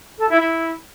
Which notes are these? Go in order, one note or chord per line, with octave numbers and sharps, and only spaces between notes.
A4
E4
E4